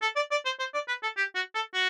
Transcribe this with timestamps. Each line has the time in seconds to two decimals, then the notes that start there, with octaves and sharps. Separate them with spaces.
0.02 A4
0.16 D5
0.31 D5
0.45 C5
0.59 C5
0.74 D5
0.88 B4
1.03 A4
1.17 G4
1.35 F#4
1.55 A4
1.74 F#4